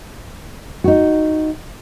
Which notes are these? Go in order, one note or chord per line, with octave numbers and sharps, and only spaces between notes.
D#4 F#4